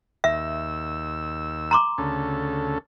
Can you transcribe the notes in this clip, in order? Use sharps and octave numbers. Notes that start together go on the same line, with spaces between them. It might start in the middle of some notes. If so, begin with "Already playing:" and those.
D#2 E5 E6
A#5 C6 D6
D2 C#3 A4